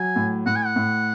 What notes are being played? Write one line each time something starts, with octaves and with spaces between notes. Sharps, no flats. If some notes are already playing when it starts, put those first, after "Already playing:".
Already playing: F#3 G#5
A2
A2 F#5
G#5
F#5
A2